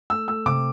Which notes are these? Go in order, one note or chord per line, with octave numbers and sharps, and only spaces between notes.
A3 E6
A3 E6
C3 D6